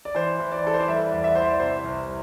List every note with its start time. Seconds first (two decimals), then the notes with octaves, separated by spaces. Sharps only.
0.05 D5
0.15 E3 C5
0.40 E3
0.52 D5
0.64 E3 A4
0.74 C5
0.81 D5
0.88 G3 E5
1.06 D5
1.12 E2
1.24 E5
1.35 E3 C5
1.42 D5
1.60 C3 C5
1.84 C2